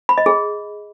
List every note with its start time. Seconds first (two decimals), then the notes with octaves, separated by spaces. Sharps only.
0.09 B5
0.18 D#5
0.26 G#4